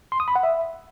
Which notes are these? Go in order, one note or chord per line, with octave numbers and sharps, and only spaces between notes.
C6
D#6
B5
F#5
E5